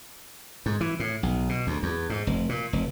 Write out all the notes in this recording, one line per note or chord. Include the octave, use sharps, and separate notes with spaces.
G#2
E3
A2
B1
B2
D2
E2
G#2
F1
A#2
F1